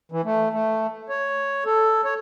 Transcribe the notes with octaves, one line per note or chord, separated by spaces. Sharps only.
E3
A3
A3
C#5
A4
C#5